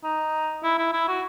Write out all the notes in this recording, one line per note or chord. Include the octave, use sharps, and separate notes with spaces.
D#4
E4
E4
E4
F#4